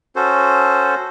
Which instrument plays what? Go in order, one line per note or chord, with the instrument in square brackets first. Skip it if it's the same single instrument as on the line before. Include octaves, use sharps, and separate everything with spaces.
[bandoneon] C#4 F#4 A4 C5